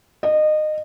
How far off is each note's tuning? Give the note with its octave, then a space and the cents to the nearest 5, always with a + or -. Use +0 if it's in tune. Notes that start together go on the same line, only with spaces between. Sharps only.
D#5 -25